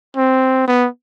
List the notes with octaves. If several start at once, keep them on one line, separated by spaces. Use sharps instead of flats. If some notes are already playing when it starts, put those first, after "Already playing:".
C4
B3